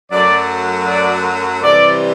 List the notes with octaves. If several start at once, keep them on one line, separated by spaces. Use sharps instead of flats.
F#2 F#3 A3 D5
D5
C3 E3 G3 D5